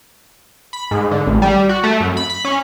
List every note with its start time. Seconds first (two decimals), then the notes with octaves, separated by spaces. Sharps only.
0.73 B5
0.91 G#2
1.11 D3
1.27 A1
1.42 G3
1.69 F#4
1.84 A3
2.00 F#2
2.17 B5
2.30 B5
2.45 C#4